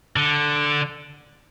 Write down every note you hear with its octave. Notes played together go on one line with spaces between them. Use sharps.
D3